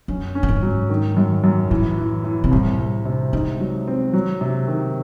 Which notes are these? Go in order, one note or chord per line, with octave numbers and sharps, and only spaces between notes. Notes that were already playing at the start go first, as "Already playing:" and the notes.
F#2 C#4
C#4
A2
G#2
F#3
D#3
F#2
F#2
A2 E3
E3
E3
C3
C2 A2
C2
C3
G#3 D#4
F#3
C4
F#3
C3
D#3